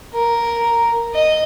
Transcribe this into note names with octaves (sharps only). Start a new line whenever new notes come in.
A#4
D#5